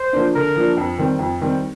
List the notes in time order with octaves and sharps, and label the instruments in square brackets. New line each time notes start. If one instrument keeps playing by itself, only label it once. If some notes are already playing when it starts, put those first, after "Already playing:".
Already playing: [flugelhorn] C5
[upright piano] F3 A#3 D4
[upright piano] D3 [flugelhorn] A#4
[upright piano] F3 A#3 D4
F2
D#3 G3 C4
F2
D#3 G3 C4